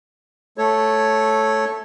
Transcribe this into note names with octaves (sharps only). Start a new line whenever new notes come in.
A3 A4 C#5